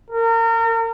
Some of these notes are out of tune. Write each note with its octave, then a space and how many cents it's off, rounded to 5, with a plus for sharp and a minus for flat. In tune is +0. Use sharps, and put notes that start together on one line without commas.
A#4 -35